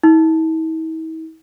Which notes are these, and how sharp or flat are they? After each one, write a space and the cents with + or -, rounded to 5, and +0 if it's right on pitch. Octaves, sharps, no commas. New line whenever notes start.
E4 -45